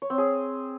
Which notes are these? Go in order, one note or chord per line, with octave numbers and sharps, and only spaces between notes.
C#5
C4
G#4